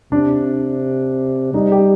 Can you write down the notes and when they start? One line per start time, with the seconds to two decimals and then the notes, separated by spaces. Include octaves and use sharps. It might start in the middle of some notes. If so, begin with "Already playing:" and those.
0.12 C3 D4
1.54 G3 D#4
1.72 G4